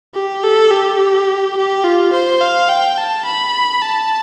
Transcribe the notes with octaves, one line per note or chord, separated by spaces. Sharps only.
G4
A4
G4
G4
F4
C5
F5
G5
A5
B5
A5